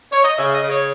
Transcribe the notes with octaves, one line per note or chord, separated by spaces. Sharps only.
C#5
D#5
C#3 E5
D#5
C#3
C#5